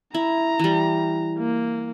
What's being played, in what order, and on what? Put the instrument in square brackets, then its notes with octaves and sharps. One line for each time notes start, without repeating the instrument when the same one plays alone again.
[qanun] E4 [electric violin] A#5
[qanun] E3 G3
[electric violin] A#3